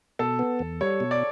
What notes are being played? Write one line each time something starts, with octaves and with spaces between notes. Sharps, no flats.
B2 A4
B3
E2
G3 C#5
B2
D5